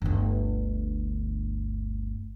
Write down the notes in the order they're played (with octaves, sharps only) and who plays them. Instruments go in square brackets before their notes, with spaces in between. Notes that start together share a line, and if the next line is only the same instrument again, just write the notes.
[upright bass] G1 D2